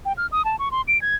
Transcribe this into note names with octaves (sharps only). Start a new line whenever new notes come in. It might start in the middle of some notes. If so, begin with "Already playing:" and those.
G5
F6
D#6
A5
C#6
C6
D7
G#6